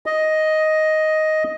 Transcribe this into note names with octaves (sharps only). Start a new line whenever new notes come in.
D#5